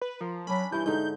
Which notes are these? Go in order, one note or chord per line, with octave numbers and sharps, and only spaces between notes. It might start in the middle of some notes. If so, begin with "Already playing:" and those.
B4
F3 A#4
F#3 C#4 D4 B5
G2 E3 E4 G6
G#2 D3 D#4 G6